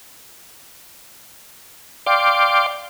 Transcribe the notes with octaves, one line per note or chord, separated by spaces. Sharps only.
D5 F5 G5 C6 D6